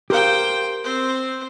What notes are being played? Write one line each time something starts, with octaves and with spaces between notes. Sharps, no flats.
G4 A#4 C5 F5 G5
C4 C5